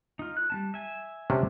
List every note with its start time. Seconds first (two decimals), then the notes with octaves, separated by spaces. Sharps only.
0.19 D#4 F4
0.37 F#6
0.50 G3 C#4 A5
0.74 E5 G#5
1.30 C3 C#4 D4